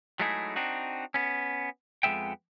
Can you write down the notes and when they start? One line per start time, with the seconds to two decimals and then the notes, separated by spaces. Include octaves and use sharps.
0.20 F#3 G#3 A3 D#4 E4 G#4
0.56 C4 D4 D#4 F#4
1.14 B3 C#4
2.03 F2 F#3 G#3 B3 E5 G5